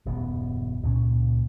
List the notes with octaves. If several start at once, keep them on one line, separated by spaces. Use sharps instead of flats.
D#1 F#2 C#3 B3
C#2 A#2 G3 C#4